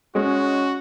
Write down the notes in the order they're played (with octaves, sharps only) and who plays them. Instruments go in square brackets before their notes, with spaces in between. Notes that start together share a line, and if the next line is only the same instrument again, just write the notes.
[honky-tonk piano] G#3 [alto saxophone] C#4 [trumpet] F#4